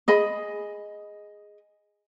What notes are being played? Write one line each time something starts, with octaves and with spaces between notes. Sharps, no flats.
G#4 D#5 B5